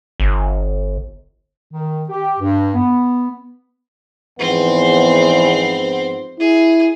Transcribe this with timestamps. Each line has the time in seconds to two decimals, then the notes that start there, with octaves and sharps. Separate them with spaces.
0.20 G1
1.71 D#3
2.09 G4
2.40 G2
2.75 B3
4.39 E2 G#2 F3 B3 C4 C5
6.40 E4 G#4